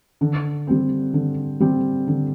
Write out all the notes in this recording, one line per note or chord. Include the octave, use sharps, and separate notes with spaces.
D3
G3 C4
D3
G3 C4
D3